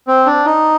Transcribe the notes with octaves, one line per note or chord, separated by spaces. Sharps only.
C4
D4
D#4